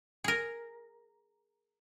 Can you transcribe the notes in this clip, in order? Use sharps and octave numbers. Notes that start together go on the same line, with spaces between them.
G#4 A#4